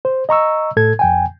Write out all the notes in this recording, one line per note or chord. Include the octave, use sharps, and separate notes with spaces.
C5
D#5 A#5 C#6 E6
A2 A4 G#6
F2 G5 G#5